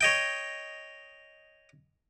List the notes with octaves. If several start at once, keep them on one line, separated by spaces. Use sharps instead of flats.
C#5 D#5 G5